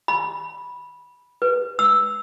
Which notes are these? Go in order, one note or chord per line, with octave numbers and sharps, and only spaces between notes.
B5
B4
E6